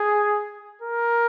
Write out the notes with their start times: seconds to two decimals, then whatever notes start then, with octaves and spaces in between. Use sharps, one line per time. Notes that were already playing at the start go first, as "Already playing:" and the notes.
Already playing: G#4
0.82 A#4